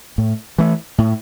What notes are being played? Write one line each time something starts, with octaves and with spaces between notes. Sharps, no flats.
A2
E3 A3
A2